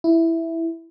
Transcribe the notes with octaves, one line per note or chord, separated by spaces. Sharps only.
E4